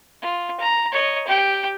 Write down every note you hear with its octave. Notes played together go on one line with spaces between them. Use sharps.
F4
A#5
C#5 D#5
G4 G5